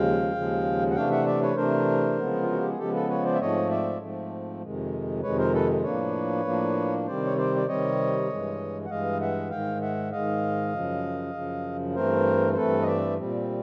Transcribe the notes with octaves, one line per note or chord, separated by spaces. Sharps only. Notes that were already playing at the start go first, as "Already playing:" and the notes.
Already playing: D#2 C#3 F3 G#3 F5 G5
D#2 C#3 F3 G#3
F#5
C3 E3 A3 D4 F5 G5
E5 F#5
D5 E5
B4 C#5
C3 E3 A3 D4 A#4 C5
C#3 F3 G#3 B3
F4
F#4
G4
G#4
C#3 F3 G#3 B3 G4 A4
A4 B4
B4 C#5
C5 D5
E5
G#2 F3 A3 C4 C#5 D#5
D5 E5
G#2 F3 A3 C4
F2 C3 D#3 G#3
F2 C3 D#3 G#3 B4 C#5
A#4 C5
A4 B4
A2 F3 A#3 D4 B4 C#5
A2 F3 A#3 D4
C3 D#3 G3 C4 C5 D5
C#5
C5 D5
D5
C3 D#3 G3 C4 C#5 D#5
G2 E3 G#3
F#5
G2 E3 G#3 D#5 F5
E5 F#5
G#2 D#3 G#3 F5 G5
E5 F#5
G#2 D#3 G#3 D#5 F5
F#2 C#3 F3
F#2 C#3 F3
G2 E3 A3 C4 A#4 C5
C5
G2 E3 A3 C4 A4 B4
D#5
D5 E5
A#2 G3 C4